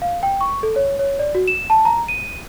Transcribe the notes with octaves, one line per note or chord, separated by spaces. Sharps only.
F5
G5
C#6
A4
C#5
C#5
D5
F#4
E7
A5
A#5
D#7